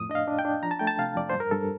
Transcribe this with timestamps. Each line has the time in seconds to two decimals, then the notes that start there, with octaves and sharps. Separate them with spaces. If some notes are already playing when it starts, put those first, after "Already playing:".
Already playing: F2 A2 D#6
0.09 D4 D#5
0.15 F5
0.28 D4
0.39 G5
0.45 D4
0.63 F3 A#5
0.71 A5
0.79 A3 G5
0.87 A5
0.99 C3 F5
1.16 F2 D5
1.30 G2 C5
1.40 A#4
1.51 G2 A4